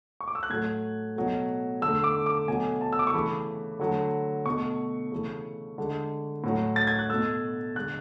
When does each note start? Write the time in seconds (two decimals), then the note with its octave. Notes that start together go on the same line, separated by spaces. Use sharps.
0.21 C#6
0.28 D6
0.35 E6
0.43 F#6
0.50 A2 F#3 A3 G#6
1.16 B2 F#3 A3
1.82 D3 A3 E6
2.04 D6
2.26 D6
2.48 B2 F#3 A3 G#5
2.81 A5
2.93 E6
2.99 D6
3.07 C#6
3.14 C#3 E3 A3 B5
3.79 D3 F#3 A3
4.46 B2 A3 C#6
5.12 C#3 E3 A3
5.78 D3 G#3
6.44 A2 F#3 A3
6.76 A6
6.87 G#6
6.99 F#6
7.10 B2 A3 E6
7.75 D3 G#3 F#6